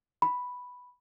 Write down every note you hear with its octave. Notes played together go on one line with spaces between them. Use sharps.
B5